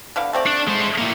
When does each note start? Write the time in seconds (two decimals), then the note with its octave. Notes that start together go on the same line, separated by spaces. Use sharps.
0.16 D3 B3 F5
0.33 A3 C4 D5
0.46 D4
0.67 G#3 C5
0.98 A2 A#3